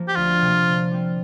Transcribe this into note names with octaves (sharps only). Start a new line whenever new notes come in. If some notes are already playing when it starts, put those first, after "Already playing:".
Already playing: F3 A#3
G4
D2 F4
C3 F3 A#3
D3
G3 C4